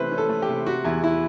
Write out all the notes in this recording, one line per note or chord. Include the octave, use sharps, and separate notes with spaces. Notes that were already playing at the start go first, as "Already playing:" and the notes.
Already playing: C3 E3 A3 C#4 B4 C5
C#4
A4
A3
G4
C3
C3 F#4
E2 E4
E3 E4